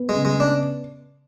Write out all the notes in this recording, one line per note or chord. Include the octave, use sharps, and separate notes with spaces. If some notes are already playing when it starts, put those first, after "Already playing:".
Already playing: B3
G#3
C#3
G#3
B3 D4